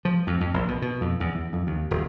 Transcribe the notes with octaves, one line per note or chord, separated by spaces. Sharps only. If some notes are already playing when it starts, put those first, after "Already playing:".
F3
F2
F2
A#1
B2
B2
F2
E2
E2
F2
D#2
D#1